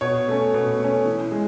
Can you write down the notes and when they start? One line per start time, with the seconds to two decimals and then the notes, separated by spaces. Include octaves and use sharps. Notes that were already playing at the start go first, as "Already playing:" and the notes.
0.01 B2 C#5
0.28 A3 C#4
0.54 B2
0.79 A3
0.85 C#4
1.06 E3
1.31 G#3